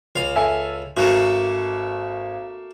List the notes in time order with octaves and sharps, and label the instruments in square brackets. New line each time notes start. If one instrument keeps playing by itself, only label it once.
[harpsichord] C#2 F5
[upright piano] A4 E5 G#5
[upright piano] G#1 [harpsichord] A3 A#3 F#4